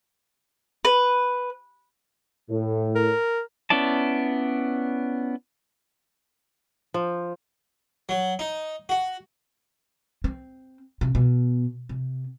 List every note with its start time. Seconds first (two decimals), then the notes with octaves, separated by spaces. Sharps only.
0.85 B4
2.50 A2
2.95 A#4
3.70 B3 C#4 E4 D5 A5
6.94 F3
8.09 F#3
8.39 D#4
8.89 F#4
10.24 C4
11.01 C3
11.15 B2
11.89 C3